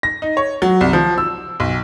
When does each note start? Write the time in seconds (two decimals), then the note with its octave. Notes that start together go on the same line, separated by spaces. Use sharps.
0.03 A#6
0.22 D#4
0.37 C#5
0.62 F#3
0.81 C2
0.93 F3
1.18 E6
1.60 B1